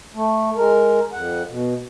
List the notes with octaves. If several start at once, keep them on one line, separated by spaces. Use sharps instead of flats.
A3
G#3 A#4
F2 F#5
B2